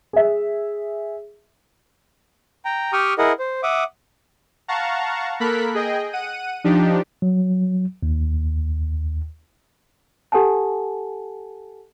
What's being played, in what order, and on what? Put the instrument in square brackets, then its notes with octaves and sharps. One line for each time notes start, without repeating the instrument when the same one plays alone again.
[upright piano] G#4 E5
[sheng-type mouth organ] G5 A#5
G4 G5 C#6 D#6 F6
E4 G#4 A#4 D#5 F#5
C5
E5 F#5 D6 D#6
[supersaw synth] F5 F#5 A5 A#5 C#6
A#3 A4 A#4 B5 F#6 B6
G#4 D#5 G5
F#5 D#7
F3 D4 D#4 G4
[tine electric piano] F#3
D#2
[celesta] G4 A4 F#5 G#5 A5